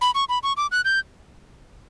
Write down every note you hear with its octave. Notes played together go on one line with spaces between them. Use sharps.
B5
C#6
B5
C#6
D6
F#6
G6